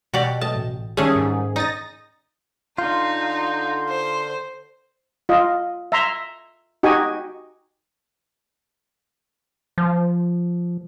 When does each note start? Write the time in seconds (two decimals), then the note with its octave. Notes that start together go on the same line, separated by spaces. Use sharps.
0.14 B2 F#4 G4 D5
0.41 F#3 A3 D#5 A5
0.56 A1
0.97 D#3 G3 A3 C#4 G#4
1.16 G#2
1.56 D#4 D#6 A6 A#6
2.78 D3 D#4 F4 C6 G6
3.89 C5
5.29 F4 D#5
5.92 E5 A#5 C6
6.83 D#4 F#4 G4 D#5 G#5
9.78 F3